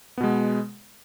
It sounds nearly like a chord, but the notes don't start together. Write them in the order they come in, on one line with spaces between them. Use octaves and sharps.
B3 B2 G#3